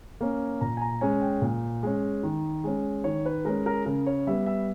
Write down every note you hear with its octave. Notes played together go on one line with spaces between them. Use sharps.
A#3 C#4
A#2 A#5
G#5
A#5
G#3 C#4 G#5
G5
A#2
G#3 C#4
D#3
G#3 C#4
D#3 C#5
B4
G#3 C#4 A#4
A#4
C#3 A#4
C#5
G3 B3 E5
E5